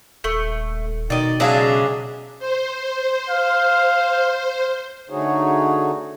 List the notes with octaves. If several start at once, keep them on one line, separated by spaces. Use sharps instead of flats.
D#1 A3
B2 D#3 D5 D#5
C#3 F#3 G#3 D4 E5 F5 G#5
C5
F5
D3 A3 D#4 F#4 G#4 C#5